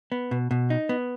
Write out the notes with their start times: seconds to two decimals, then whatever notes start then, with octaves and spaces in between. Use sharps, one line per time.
0.12 B3
0.31 B2
0.51 B2
0.70 D#4
0.89 B3